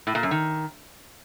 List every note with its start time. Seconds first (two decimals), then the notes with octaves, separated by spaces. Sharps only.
0.07 A2
0.15 A#2
0.23 F#2
0.31 D#3